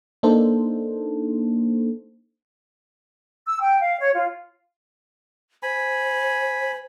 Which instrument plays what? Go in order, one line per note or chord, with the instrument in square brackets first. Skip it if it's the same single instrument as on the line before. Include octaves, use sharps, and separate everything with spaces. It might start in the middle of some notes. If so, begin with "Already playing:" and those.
[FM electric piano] A#3 D4 D#4 A4 C5
[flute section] E6
G5
F5
C#5
F4
[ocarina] C5 [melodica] G#5 B5